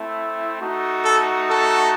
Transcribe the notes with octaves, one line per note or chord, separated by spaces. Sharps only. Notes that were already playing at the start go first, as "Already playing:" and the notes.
Already playing: A3 C4 E4
A3 D#4 F#4
A4
A4